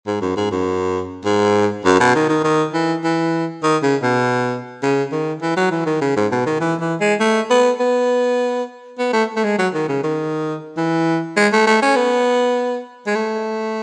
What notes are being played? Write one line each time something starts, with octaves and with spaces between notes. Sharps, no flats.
G#2
F#2
G#2
F#2
G#2
F#2
B2
D#3
D#3
D#3
E3
E3
D#3
C#3
B2
C#3
D#3
E3
F#3
E3
D#3
C#3
G#2
B2
D#3
E3
E3
G#3
A3
B3
B3
B3
A3
A3
G#3
F#3
D#3
C#3
D#3
E3
G#3
A3
A3
C#4
B3
G#3
A3